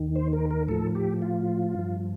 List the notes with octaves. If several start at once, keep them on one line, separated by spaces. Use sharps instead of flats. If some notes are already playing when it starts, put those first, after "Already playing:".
Already playing: D#2 D#3
C5
A#4
A#4
A2 F3 A4
G4
F4
G2 F3